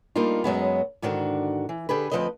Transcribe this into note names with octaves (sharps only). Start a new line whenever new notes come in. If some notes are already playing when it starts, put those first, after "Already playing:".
G3 A#3 D4 D#4 F4
F#2 F#3 G#3 B3
G#2 D3 D#3 D4 F#4
E3
D3 G4 G#4 B4
D2 C3 F3 C4 B4 D#5